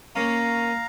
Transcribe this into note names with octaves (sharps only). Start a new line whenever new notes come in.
A#3 C#4 F5 A#5